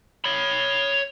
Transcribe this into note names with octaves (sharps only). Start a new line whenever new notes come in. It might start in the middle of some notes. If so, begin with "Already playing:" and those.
C#5 B5